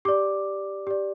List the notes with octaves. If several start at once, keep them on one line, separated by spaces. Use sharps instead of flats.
G4 D5 D6
G4 D5